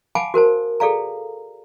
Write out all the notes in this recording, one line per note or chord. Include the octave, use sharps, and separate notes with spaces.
F5 F#5 G#5 A5 B5 D6
F#4 A#4 C5 A5
G#4 A4 D5 F5 A#5